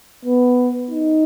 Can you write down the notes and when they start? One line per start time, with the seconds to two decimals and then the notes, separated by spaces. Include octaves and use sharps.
0.25 B3
0.91 D#4